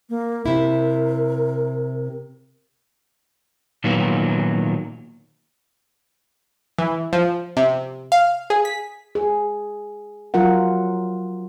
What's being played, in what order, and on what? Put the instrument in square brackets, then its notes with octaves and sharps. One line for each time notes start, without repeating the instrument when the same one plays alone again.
[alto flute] A#3
[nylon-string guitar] C3 E4 [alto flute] A#4
[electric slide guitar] A#2 D#3 F#3 B3
[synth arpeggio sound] E3
F3
C3
F5
G#4
B6
[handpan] G#4
F#3 F4 A#4 F#5